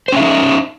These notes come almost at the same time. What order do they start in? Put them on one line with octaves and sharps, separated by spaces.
C5 C#4 E5 D#4